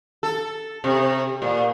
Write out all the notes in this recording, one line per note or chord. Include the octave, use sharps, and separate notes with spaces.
A4
C3
A#2